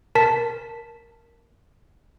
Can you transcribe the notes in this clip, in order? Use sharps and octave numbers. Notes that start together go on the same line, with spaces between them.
A#4 A5 B6